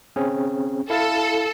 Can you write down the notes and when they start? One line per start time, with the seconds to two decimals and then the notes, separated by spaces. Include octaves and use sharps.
0.16 C4 C#4 G#4
0.90 E4 A4 F5